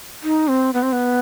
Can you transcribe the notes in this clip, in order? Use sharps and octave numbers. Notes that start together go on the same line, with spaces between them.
D#4
C4
B3
C4
B3